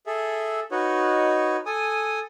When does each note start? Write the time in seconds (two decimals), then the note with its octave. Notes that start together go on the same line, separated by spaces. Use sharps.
0.06 G#4 A4 E5
0.71 D#4 F#4 B4 C#5 D#5
1.66 A4 G#5 D#6